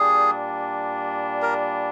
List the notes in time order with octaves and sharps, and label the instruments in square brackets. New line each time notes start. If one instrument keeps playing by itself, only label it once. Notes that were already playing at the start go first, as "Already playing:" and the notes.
Already playing: [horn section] A#2 G3 D4 [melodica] G#4
[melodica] A#4